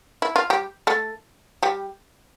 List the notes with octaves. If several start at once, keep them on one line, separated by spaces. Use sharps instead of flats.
E4
F4
G3 G4
A3 A4
G3 G4